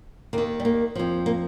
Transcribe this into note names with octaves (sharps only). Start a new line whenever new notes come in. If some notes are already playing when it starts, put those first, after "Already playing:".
D#2 D#3 A#3
G3
A#3
F2 F3
A#3